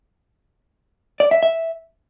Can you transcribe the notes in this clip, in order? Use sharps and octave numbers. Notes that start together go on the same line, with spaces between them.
D5
E5
E5